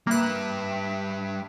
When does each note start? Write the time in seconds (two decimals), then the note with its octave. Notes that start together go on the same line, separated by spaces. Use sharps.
0.07 G3 A#3 B4 E5 G5 F#6